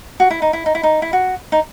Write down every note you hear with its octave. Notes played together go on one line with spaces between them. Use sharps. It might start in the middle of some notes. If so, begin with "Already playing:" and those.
F#4
E4
D#4
E4
D#4
E4
D#4
E4
F#4
D#4